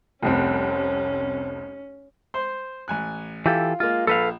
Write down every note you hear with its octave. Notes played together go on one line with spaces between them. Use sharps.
F1 C2 C4 C#4
C5 C6
A1 G#5 F#6
E3 F4 G4 A4
G#3 A#3 F4
A#1 A4 B4 F5